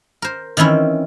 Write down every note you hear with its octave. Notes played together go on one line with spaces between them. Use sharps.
A#4 C5
D#3 E3 C4 C#4 E4